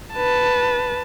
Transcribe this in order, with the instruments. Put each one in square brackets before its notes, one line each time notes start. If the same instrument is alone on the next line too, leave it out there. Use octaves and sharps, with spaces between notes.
[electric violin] B4 A5